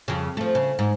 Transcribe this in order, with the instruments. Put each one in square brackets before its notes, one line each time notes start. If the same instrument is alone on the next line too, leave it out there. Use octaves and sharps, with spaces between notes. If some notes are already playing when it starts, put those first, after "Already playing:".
[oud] F2 C#3
F3 A3
C#3
G#2